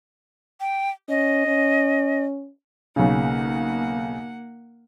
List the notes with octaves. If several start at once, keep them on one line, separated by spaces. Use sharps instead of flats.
G5
C#4 D#5
C#4
B1 C#3 A#3 F#5